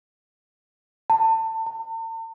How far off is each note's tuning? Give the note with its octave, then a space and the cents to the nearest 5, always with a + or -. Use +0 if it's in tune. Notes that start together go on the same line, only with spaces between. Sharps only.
A5 +25
A5 +45